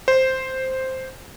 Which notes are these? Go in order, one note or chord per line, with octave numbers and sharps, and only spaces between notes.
C5